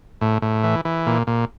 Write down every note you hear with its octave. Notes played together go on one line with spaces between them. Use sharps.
A2
A2
E3
E3
A#2
A#2